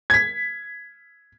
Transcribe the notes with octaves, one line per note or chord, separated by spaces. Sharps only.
G#6 B6